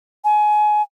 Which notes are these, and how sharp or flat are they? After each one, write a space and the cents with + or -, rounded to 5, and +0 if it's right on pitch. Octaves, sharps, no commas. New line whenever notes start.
G#5 +25